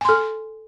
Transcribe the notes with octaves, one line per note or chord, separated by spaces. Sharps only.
A4 G#5 C6